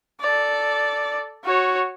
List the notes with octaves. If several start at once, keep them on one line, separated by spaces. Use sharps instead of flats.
A4 D5
F#4 C#5